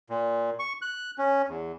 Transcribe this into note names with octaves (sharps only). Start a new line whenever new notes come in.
A#2
C#6
F#6
C#4
E2